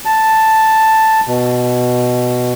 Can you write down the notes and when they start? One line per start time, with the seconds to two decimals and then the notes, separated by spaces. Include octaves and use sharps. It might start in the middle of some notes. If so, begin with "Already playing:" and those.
0.05 A5
1.27 B2